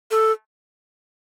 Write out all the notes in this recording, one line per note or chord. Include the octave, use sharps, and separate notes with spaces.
A4